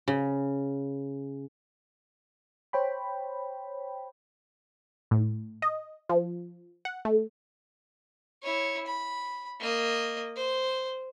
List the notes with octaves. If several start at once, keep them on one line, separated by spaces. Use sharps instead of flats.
C#3
C5 C#5 G5 B5
A2
D#5
F3
F#5
A3
E4 C#5
B5
A#3 D#5
C5